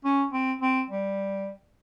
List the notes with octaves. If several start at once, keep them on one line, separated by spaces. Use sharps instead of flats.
C#4
C4
C4
G3